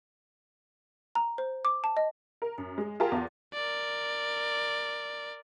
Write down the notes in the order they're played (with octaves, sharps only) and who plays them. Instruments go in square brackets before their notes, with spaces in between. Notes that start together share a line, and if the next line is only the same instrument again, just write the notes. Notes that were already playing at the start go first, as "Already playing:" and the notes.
[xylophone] A#5
C5
D6
A5
D#5
[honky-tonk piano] A#4
F#2
G#3
F4 G4 G#4 A#4 A5
E2 F4
[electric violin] A#4 D5